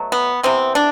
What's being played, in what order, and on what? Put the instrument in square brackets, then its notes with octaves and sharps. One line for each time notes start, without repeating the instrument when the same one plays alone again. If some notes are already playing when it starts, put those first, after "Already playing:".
Already playing: [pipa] B2 F#3 A3
B3
C3 E3 B3 C4
D4